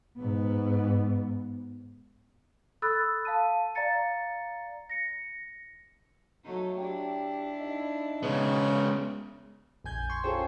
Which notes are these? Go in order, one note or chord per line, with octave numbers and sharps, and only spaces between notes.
G#2 B3
A4 B5 D#6 E6 F#6 A6
F5 A5 D#7
D5 F5 A#5 A6 C#7
A#6 C#7
F#3 A3 D#4
D4 E4 G4
D#4
C#3 G#3 B3
A#1 F2 G#5 G6 G#6
G#5 C6 C#6
C#4 F4 G#4 A4 C5 G5